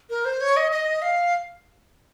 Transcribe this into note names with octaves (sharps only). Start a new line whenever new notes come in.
A#4
C5
C#5
D#5
D#5
F5